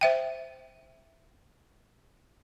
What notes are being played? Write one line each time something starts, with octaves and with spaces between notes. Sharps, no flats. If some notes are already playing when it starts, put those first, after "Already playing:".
C5 E5 G5